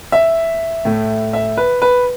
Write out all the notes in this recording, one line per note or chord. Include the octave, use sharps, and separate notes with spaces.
E5
A2 A3
E5
B4
B4